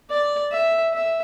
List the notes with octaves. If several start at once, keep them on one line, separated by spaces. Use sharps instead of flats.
D5
E5
E5